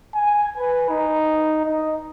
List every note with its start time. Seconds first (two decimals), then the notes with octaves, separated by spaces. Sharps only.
0.15 G#5
0.58 B4
0.90 D#4
1.66 D#5